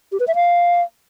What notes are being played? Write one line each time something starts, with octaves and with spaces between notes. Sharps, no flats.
G4
B4
E5
F5